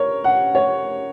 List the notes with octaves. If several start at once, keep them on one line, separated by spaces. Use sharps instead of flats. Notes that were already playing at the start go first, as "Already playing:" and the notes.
Already playing: A#4 C#5
F#5
C#5